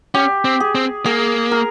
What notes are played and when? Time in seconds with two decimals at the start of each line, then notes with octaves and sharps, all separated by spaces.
0.14 C#4 G4
0.45 C4
0.60 G#4
0.75 C4
1.05 A#3 G#4
1.51 A#4